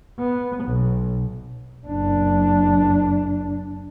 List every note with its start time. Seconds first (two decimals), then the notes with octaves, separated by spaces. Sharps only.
0.19 B3
0.65 B1
1.87 F#1 D4